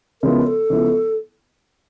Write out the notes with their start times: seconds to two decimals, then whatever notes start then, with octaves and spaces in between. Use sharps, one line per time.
0.22 C#3 F3 G#3 B3 E4 A#4
0.46 A4
0.70 C#3 F3 G#3 B3 E4